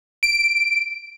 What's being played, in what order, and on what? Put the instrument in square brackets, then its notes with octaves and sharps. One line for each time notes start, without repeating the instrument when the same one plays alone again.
[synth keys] D7